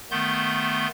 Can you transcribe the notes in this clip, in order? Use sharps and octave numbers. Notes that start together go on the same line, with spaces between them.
D#3 A3 B3 C6 G6